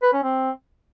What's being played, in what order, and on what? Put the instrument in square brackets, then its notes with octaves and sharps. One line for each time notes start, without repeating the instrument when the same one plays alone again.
[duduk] B4
C#4
C4